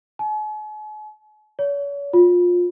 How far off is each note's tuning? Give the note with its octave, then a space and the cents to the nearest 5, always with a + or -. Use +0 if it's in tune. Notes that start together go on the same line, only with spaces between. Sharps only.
G#5 +45
C#5 +40
F4 +20